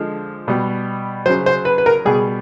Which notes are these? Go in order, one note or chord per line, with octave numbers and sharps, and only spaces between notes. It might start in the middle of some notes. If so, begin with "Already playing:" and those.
Already playing: D3 F3 G#3
B2 G3
C#3 F#3 C5
C5
B4
B4
A#4
B2 G3 G#4